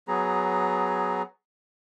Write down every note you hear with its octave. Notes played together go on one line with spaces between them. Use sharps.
F#3 B3 G#4 A#5